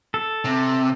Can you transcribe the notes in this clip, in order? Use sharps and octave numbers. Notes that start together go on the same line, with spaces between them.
A4
C3